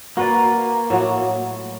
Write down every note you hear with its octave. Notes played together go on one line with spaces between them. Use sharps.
A#3 F#4 B4 D5
A2 F#3 F#4